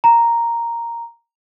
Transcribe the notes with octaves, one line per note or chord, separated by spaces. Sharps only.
A#5